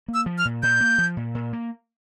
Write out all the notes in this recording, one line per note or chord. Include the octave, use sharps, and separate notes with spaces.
A#3
E6
F3
F6
A#2
A#2 G6
A#3
F3
A#2
A#2
A#3